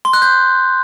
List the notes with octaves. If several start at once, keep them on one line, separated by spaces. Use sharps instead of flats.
C6
F#6
G6